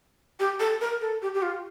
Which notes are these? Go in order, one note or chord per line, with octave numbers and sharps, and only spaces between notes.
G4
A4
A#4
A4
G4
G4
F4